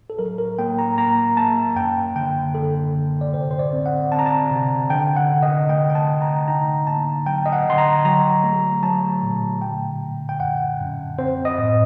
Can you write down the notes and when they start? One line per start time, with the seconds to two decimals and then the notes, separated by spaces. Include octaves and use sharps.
0.10 A4
0.19 F#3 A#4
0.38 A#4
0.59 A#3 G5
0.79 A#5
0.98 A#3 A#5
1.37 A#3 A5
1.76 F#2 G5
2.16 D3 G5
2.54 D3 A4
2.95 D3
3.21 D5
3.33 C3 C5
3.51 C5
3.59 D5
3.73 C4
3.86 F#5
4.12 C4 A5
4.19 A#5
4.26 A5
4.51 C3
4.90 D3 G5
5.16 F#5
5.29 D3
5.43 D#5
5.69 A3 G5
5.90 G5
5.95 A5
6.08 D3
6.22 A#5
6.48 D#4 A#5
6.87 A#3 A5
7.26 F#3 G5
7.46 D#5
7.52 F#5
7.66 D3 C6
7.78 A#5
8.05 F#3 A#5
8.44 A3
8.83 F#3 A5
9.22 A#2
9.62 D3 G5
10.01 D3
10.29 G5
10.40 F#2 F#5
10.80 F#2
11.18 C4 C5
11.45 D#5
11.58 A2